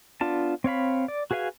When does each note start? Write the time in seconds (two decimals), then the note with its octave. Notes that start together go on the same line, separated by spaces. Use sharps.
0.21 B3 D4 F4 A5
0.64 C4 C#5 F5 B5
1.08 D5
1.31 F#4 G#4 B4 F5 G#5